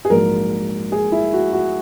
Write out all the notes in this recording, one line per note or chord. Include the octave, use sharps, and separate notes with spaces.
G#4
A#1 G#2 F#3 A#3 A#4
G#4
E4
F#4
F#4